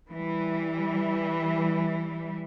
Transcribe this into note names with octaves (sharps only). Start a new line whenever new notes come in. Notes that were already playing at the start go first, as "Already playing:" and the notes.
E3 G3